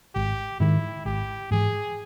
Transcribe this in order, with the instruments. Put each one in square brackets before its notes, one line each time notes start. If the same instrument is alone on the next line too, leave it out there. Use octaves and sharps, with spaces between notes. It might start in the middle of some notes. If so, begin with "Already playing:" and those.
[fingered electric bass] G#1 [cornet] G4
[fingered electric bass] G#2 D#3 [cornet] E4
[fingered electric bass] G#1 [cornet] G4
[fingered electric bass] G#2 E3 [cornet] G#4